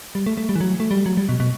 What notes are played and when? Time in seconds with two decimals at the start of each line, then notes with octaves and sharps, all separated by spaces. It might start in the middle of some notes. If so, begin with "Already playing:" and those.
0.15 G3
0.26 A3
0.37 A3
0.49 G3
0.56 E3
0.61 F#3
0.80 A3
0.91 G3
1.06 F#3
1.17 G3
1.29 B2
1.40 B2